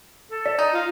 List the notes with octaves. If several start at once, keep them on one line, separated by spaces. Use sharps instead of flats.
A4
D5 B6
D#4 D#5
F4